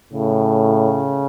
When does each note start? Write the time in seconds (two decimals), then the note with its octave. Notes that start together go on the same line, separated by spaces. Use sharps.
0.13 A2 C#3